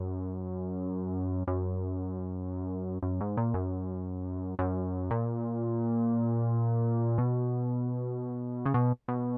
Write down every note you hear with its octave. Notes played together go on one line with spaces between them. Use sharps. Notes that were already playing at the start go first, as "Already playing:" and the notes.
Already playing: F#2
F#2
F#2
G#2
A#2
F#2
F#2
A#2
B2
C#3
B2
B2